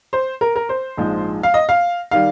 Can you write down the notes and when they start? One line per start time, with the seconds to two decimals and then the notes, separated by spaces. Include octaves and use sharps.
0.13 C5
0.41 A#4
0.56 A#4
0.69 C5
0.97 A#1 G#2 F3 G#3
1.43 F5
1.54 D#5
1.69 F5
2.11 D#3 G3 F5